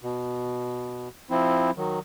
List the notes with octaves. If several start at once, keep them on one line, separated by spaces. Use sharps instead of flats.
B2
F3 C4 E4
D#3 F#3